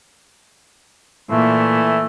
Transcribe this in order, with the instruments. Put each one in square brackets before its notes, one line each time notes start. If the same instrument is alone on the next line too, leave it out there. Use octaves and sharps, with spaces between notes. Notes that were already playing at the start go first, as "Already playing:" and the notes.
[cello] A#2 [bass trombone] E3 [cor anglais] A3